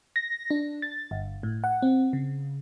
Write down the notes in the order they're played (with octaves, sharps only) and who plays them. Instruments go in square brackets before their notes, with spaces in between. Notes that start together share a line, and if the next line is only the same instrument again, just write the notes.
[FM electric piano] A#6
D4
A6
G1
A2
F#5
C4
C#3